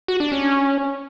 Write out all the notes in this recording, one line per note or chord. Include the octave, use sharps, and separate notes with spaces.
F#4
D4
C#4